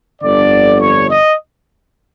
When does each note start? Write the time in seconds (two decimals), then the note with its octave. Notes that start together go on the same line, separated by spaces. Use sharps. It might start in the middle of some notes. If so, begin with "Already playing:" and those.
0.22 G1 F2 D3 D5
0.80 C#5
1.09 D#5